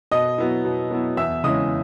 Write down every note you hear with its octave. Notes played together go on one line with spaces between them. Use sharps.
B2 D#5 D#6
F#3 B3 E4
B2
F#3 B3 E4
E2 E5 E6
C#3 E3 G#3 C#4 D#5 D#6